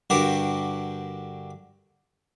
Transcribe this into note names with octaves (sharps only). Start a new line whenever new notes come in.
G2 D3 F#4 G4 A#4